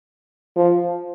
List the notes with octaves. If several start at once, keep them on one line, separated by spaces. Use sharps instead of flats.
F3